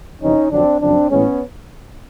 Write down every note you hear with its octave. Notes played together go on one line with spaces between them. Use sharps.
F2 C3 E3 G3 C#4 D#4
F2 D3 F#3 C4 D4
F#2 C#3 F3 C4 D4
A2 E3 G#3 B3 C#4